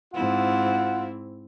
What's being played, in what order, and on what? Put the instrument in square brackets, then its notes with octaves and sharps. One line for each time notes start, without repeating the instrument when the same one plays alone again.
[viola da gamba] G#2 C4 E4 [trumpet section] F4 F#5